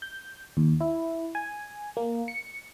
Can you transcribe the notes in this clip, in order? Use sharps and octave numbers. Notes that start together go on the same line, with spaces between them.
G6
D#2
E4
G#5
A#3
C#7